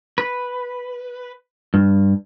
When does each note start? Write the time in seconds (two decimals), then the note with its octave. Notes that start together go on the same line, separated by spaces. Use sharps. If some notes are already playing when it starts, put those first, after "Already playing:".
0.18 B4
1.74 G2